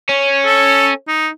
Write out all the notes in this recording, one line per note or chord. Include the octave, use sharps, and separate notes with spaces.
C#4
A4
D#4